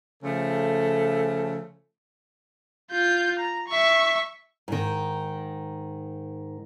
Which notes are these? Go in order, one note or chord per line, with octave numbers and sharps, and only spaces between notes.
C#3 F3 A3 A4
F4 G6
A#5
E5 C#6
G#2 D#3